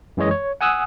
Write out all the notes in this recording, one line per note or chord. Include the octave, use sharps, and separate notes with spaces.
F#2 E3 G#3 C#5 D#5
C#5
F#5 G#5 D#6 E6 F#6